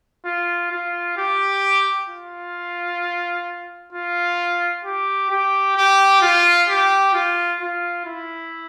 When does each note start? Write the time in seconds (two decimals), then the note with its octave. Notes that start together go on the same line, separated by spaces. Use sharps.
0.25 F4
0.71 F4
1.17 G4
2.09 F4
3.92 F4
4.85 G4
5.30 G4
5.76 G4
6.22 F4
6.68 G4
7.14 F4
7.60 F4
8.06 E4